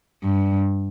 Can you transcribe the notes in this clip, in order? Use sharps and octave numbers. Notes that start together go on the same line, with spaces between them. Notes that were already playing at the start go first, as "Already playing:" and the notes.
G2